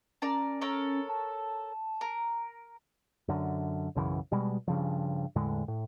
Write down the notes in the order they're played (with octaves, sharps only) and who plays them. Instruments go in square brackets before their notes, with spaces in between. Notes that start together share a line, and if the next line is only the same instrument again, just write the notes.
[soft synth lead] C#4 [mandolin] A#4 D5 A5
[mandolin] A4 A#4 C#5
[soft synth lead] A5
[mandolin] A#4
[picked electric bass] F#2 D3
B1 F#2 C#3 E3
B2 G3 G#3
G2 C#3 F3
E2 A2 D3 G#3
A2